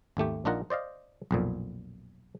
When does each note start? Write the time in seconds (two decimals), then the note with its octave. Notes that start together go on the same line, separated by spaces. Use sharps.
0.17 G#1 D#2 A3 G4
0.45 A#1 D4 D#4 F4 A#4 F#5
0.70 C5 D5 D#5 F5
1.31 B1 F2 A#2